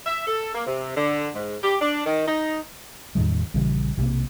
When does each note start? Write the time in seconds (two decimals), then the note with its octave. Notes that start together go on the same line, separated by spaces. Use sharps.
0.06 E5
0.27 A4
0.55 A#3
0.67 C3
0.96 D3
1.35 G#2
1.63 G4
1.81 D4
2.06 D#3
2.28 D#4
3.15 E2 A2 D#3 G3
3.54 A#1 C#3 E3 G3
3.97 B1 C3 F#3 A#3